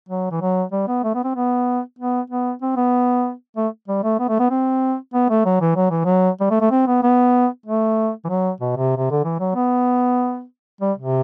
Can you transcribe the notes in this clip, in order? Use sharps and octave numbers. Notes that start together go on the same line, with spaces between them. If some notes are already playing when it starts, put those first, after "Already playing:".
F#3
E3
F#3
G3
B3
A3
B3
C4
B3
B3
B3
C4
B3
A3
G3
A3
B3
A3
B3
C4
B3
A3
F#3
E3
F#3
E3
F#3
G3
A3
A3
C4
B3
B3
A3
E3
F#3
B2
C3
C3
D3
E3
F#3
B3
G3
C3